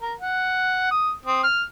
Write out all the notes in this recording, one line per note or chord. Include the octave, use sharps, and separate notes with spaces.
A#4
F#5
D#6
C4 D#6
F6